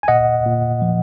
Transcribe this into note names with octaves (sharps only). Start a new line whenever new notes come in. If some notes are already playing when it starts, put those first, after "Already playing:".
G#5
A#2 D#5 F#5
A#2
F3